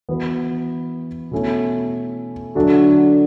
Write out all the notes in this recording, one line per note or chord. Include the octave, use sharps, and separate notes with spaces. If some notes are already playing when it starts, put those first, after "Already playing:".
E3 B3 F#4 B4
B2 A3 C#4 E4
D3 F#3 A3 D4 F#4